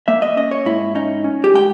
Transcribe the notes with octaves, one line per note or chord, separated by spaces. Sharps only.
A#3 E5
D#5
C#4 D#5
C#5
G#2 E4
C#4 D#4
C#4
G4
G#3 G5